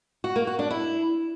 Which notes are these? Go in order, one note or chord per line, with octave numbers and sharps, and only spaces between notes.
F#4
A#3
F#4
D4
E4